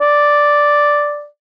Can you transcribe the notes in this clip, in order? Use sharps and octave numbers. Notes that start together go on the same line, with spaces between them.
D5